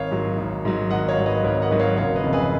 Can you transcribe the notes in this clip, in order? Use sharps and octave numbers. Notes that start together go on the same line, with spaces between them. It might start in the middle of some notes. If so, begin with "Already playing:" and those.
Already playing: G#1 C#5 F5
G#2 F#3
G#1
G#2 F#3
G#1 D#5 F#5
C#5 F5
G#2 F#3
B4 D#5
G#1 A#4 C#5
D#5 F#5
G#2 F#3
C#5 F5
F#1 C#5 F5
B4 D#5
F2 C#3
G#4 B4